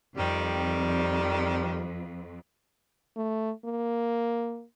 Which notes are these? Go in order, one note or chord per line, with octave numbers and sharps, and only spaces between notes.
F2 D#3 G3
A3
A#3